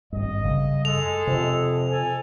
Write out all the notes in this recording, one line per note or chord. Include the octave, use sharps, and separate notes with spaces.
G#1 G2 D#5
F#2 C#3 G3
G#3 A4 F7
F2 C3
A4 G#5